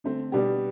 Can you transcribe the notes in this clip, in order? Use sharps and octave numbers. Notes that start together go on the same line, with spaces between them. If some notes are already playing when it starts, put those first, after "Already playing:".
D3 A3 C4
B2 G3 D4 G4